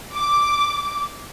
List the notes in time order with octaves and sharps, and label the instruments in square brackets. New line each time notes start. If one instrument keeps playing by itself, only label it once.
[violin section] D6